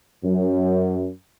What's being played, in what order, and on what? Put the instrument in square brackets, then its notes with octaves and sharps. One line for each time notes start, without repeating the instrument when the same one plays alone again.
[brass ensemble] F#2